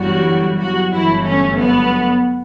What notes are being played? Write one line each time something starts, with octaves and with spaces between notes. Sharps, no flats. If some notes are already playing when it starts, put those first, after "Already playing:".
Already playing: G1 G2 E3 F#3 G3 F#4
F#3 F#4
G1 G2 E3 F#3 A3 E4
C#4
B3